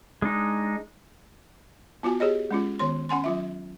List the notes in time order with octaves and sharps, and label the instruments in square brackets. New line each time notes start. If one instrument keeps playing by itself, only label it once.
[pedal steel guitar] G#3 D4 D#4
[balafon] B3 F4 F#4 G#5
G4 G#4 C#5 D#5
G#3 C#4 F4
D#3 B3 C#5 C6
C#4 F#5 G#5 C6
F#3 F4 E5